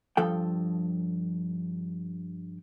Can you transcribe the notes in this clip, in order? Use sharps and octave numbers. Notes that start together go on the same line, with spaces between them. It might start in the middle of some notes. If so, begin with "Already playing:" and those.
G2 F3 A4 G5